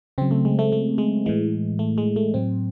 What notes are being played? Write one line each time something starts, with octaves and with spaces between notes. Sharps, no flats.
C#3 F#3 C4
A3
G#3
A3
A3
G#3
A2 E3 G#3
A3
G#3
A3
A2 F#3 C4